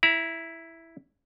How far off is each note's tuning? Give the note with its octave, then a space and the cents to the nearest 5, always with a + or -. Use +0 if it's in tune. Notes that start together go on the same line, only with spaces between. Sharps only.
E4 +0 A#5 +45